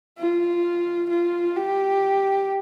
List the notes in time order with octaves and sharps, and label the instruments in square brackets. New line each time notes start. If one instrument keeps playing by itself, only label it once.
[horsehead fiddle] F4
F4
G4